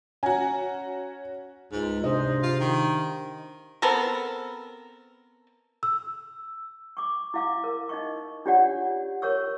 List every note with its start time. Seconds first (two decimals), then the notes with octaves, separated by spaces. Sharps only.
0.23 C#4 F#4 G#5 A#5
1.72 C#2 G#2
2.04 G#2 C3 D4 C5 D#5
2.43 F4
2.60 D#3
3.82 B3 C4 A4 A#4
5.83 E6
6.97 C#6 D6
7.34 E4 F5 D6
7.64 A#4
7.89 D#4 D#5 C#6
8.46 D4 F4 G4 C#5 D5 F#5
9.22 A#4 C#5 C#6 E6